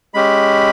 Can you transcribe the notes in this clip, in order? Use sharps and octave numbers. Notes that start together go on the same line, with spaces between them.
G#3 C#4 G4 B5